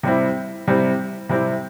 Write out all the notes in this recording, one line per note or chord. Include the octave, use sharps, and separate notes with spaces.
C3 G3 C4 E4
C3 G3 C4 E4
C3 G3 C4 E4